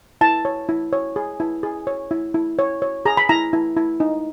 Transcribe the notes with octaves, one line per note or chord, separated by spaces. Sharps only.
E4 A5
C#5
E4
C#5
G#4
E4
G#4
C#5
E4
E4
C#5
C#5
G#4 A#5
B5
E4 A#5
E4
E4
D#4